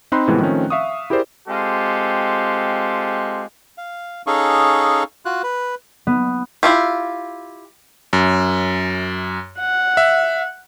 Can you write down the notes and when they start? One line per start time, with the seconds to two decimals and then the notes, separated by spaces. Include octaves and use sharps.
0.12 C4 D#4 B5 C6 F#6
0.27 A2 C3 E3 F3 G#3 B3
0.41 D#3 F3 A3 C4 C#4
0.70 E5 F5 C#6 D#6
1.10 E4 G4 G#4 A#4 C5 D5
1.48 G#3 C4 F4 G4 A4
3.78 F5
4.27 C#4 D#4 G#4 A4 F5 C#6
5.25 F4 F#4 F#6
5.43 B4
6.07 B3
6.63 E4 F4 G4
8.13 F#2
9.59 F#5
9.97 E5